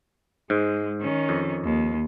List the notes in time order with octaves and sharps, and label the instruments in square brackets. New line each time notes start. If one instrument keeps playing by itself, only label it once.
[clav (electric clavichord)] G#2 [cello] G#3
[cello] D#3 C#4
[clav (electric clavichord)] F2
[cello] D#2